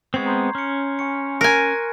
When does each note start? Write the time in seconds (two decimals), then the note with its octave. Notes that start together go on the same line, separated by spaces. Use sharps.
0.14 G#3 B3 C4 C#6 G#6 C7
0.26 A#5 C6 G6
0.55 C#4 F6 C#7
0.99 G#5 C#6 C#7
1.41 A#4 G#5 F#6